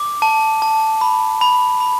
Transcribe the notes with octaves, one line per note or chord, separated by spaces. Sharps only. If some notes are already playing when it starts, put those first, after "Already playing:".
Already playing: D6
A5
A5
B5
B5
B5